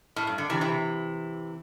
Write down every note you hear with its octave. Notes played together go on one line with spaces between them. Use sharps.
A2
G2
D3
C3 E3
C3 E3